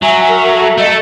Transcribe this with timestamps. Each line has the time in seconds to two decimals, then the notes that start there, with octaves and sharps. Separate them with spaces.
0.02 F#3 E5 G#5
0.28 A#4
0.52 A4
0.78 A3 D#5